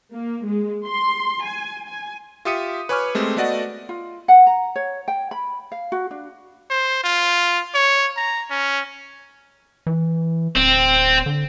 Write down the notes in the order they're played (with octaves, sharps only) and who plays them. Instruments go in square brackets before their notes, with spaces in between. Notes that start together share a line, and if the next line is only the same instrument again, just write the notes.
[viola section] A#3
G#3
C6
G#5
G#5
[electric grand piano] F4 G4 E5 D#6 C#7 D#7
B4 C#5 G#5 C#6 D6 F6
G#3 A3 C4 G4
A3 B3 F#4 D5 D#5 F#5
[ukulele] F4
F#5
A#5
C#5
G5
B5
F5
F#4
D4
[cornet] C5
F4
C#5
A#5
C#4
[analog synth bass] E3
[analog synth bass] D1 [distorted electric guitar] C4
[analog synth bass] D3